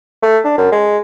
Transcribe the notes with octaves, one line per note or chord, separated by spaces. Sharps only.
A3
D4
F#2
G#3